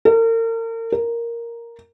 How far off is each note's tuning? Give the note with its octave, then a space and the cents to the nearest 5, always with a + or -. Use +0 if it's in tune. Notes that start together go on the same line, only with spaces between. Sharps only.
A#4 -40
A#4 +0